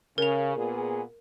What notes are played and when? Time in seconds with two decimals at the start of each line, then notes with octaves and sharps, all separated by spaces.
0.18 C#3 A#4 F7
0.56 A#2 B3 G#4